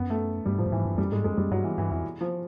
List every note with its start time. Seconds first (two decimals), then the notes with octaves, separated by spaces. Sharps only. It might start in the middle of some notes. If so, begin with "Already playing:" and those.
Already playing: F#2 B3
0.10 A3
0.46 G2 G3
0.58 A2 F3
0.66 G2
0.72 G#2 E3
0.85 G2
0.94 F2
0.98 F#2 G3
1.11 G#2 G#3
1.24 F#2 G#3
1.37 F#2 G3
1.51 G2 F#3
1.64 E3
1.78 G2 E3
1.91 F2 E3
2.21 F3